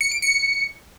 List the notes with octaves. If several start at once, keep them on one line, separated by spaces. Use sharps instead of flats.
C#7
D7
C#7